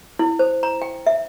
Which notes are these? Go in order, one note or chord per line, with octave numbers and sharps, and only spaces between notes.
E4
C5
A#5
G5
E5